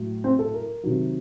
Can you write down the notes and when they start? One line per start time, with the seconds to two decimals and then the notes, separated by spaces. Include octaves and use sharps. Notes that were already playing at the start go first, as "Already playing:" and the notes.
Already playing: A2 F#3
0.24 C4
0.39 A4
0.54 A#4
0.83 C3 D#3 F#3